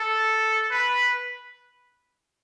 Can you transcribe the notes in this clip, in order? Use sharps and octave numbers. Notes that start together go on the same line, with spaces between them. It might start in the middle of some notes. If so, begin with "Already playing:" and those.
Already playing: A4
B4